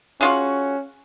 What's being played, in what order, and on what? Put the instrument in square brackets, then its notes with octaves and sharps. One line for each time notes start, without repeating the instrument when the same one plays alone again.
[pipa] G#3 F4 F#4 [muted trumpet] C#4